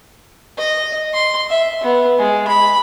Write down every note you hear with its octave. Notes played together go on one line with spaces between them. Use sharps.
D#5
C6
E5
B3
G#3
B5